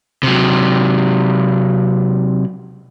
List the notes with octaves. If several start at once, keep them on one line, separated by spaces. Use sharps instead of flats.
C3 F#3